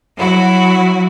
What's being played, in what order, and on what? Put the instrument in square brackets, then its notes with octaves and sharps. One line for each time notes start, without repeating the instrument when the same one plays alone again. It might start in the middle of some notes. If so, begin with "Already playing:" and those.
[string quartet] F#3 E4 F#4